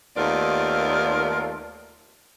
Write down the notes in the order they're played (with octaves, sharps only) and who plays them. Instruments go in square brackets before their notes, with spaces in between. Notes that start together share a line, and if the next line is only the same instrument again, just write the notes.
[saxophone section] D#2 A3 B3 F4 A#4 D5